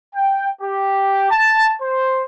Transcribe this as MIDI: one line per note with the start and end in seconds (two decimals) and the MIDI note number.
0.14 0.47 79
0.62 1.28 67
1.30 1.71 81
1.81 2.23 72